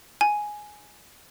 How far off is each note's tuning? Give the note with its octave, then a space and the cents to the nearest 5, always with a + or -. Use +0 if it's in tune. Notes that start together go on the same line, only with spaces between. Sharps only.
G#5 +5